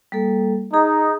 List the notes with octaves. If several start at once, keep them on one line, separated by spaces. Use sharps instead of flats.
G3 A#3 A4
D#4 G#4